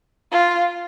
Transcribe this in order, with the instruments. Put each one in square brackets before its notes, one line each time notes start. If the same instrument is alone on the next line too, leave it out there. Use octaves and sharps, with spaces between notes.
[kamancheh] F4